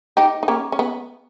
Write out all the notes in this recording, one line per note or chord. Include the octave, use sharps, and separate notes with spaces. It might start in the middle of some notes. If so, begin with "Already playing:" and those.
D#4 G4
D#4
A#3 C#4
C#4
B3